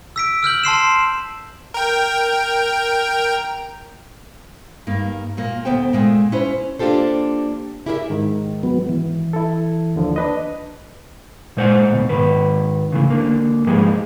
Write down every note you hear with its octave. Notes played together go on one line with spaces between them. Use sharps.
E6 B6 D7
E6 F6 G6 F#7
A5 C6 C7 E7
A#4 G5
G2 A#3 D#4
A#2 A#3
D2 B3 C5 G5
A#2 G#3 A3
C#4 E4 B4 C5
A#3 D4 F4 G4 A4 C5
E4 G4 G#4 A#4 B4 E5
G#2 D#3
F#3 B3
E3
E4 A4
D#2 D3 F3
D4 B4 D#5
A#2 G#3 C5 E5 F#5
D2 B2
G#2 D#3 B4
C#3 E3 A3
D3 A#3
G#2 F3 G3 G#3 G#4